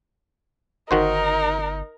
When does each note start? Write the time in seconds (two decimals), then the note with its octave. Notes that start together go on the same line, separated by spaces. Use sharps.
0.91 G1 D#3 D#4 F#4 A#4 C5